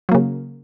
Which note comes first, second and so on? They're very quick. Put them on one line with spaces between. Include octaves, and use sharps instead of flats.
F#3 A#3 C#3